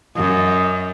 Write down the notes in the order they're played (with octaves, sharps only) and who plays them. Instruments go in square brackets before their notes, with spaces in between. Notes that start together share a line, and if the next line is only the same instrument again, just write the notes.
[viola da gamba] F#2 [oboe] D#5